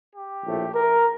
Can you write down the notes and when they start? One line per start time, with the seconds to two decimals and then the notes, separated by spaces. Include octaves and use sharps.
0.15 G4
0.45 A#1 A2 A3
0.75 A#4